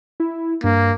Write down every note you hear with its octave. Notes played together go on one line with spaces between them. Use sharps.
E4
G2 A#3